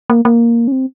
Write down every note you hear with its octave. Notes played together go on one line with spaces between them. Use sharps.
A#3
A#3
C#4
C4